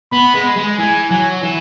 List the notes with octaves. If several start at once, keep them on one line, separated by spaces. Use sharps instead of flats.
B3 B5
G#3
G#3
E3 G#5
F#3 G#5
E3